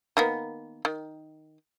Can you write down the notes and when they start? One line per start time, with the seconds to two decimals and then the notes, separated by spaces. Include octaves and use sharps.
0.17 D#3 A#3 B3
0.85 D#3